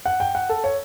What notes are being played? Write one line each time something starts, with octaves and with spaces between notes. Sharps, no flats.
F#5
G5
F#5
A4
C#5